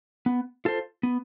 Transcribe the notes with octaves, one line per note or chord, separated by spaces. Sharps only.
B3
F4 A4 C5
B3